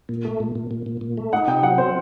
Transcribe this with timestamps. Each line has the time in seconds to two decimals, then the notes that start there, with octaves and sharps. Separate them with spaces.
0.09 A#2
0.25 A3
0.40 A#2
0.55 A#2
0.71 A#2
0.86 A#2
1.01 A#2
1.17 A3
1.32 D#4 F#5
1.48 C3 G5
1.63 F#3 F#5
1.78 C4 C5